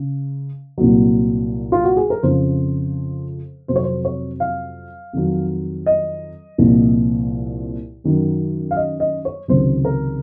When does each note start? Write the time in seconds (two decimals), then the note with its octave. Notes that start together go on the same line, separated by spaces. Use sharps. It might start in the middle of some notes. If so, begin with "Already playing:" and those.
Already playing: C#3
0.78 C2 A#2 F#3
1.72 F4
1.84 F#4
1.97 G#4
2.10 A#4
2.23 F2 C#3 F3 C5
3.68 F2 C3 F#3 C5
3.76 C#5
3.83 C5
4.05 C#5
4.40 F5
5.13 F2 D#3 F#3
5.86 D#5
6.58 C2 A#2 F3
8.04 F#2 D#3 F#3
8.71 F5
8.77 D#5
9.00 D#5
9.25 C#5
9.48 C#2 C3 D#3 F#3 C5
9.85 A#4